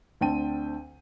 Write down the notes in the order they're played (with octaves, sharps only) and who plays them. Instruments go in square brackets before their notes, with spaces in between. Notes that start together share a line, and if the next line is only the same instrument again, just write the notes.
[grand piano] D2 D3 C4 G5 A5 D#7